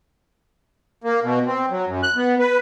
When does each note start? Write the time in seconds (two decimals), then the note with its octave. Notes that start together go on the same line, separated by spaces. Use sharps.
1.04 A#3
1.23 B2
1.46 C4
1.70 F#3
1.86 F#2
2.03 F#6
2.16 B3
2.39 B4